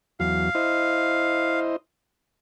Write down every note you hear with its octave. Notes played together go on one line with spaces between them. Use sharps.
E2 F#3 F5
E4 C5 D#5